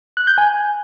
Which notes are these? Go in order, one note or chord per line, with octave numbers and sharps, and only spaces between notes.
F#6
G6
G#5